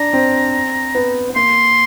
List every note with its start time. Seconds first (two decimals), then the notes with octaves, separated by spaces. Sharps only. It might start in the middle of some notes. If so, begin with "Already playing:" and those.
Already playing: D4 A#5
0.13 C4
0.95 B3
1.30 B3
1.36 A#3 C6